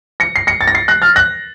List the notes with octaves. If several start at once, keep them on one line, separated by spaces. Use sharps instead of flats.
A#6 C#7
C7
A#6 C#7
A6
A#6
A6 C7
F#6 A#6
F6 A6
F#6 A#6